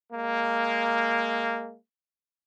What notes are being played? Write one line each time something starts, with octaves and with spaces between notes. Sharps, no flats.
G#3 A#3